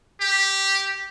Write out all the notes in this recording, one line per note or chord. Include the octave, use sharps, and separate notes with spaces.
G4